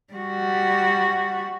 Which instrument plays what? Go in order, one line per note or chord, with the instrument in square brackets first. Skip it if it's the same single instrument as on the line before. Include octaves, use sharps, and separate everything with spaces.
[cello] G3 F#4